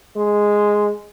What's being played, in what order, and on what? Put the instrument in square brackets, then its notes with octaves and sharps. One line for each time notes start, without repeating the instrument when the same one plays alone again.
[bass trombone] G#3